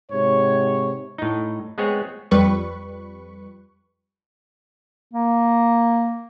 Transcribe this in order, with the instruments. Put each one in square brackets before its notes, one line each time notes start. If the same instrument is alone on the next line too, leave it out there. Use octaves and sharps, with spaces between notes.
[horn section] G#2 C3 C#5
[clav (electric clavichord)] A2 D#4
G#3 B3 C4 G#4 C#5
[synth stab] F2 G3 B4 C#6
[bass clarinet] A#3